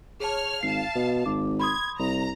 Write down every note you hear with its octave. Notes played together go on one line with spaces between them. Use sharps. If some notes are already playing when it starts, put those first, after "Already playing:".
G#4 C#5 A5 F6
G#1 F5 A5 C7
B2
G#1 D6
B5 C6 D#6 G#6
C2 A#5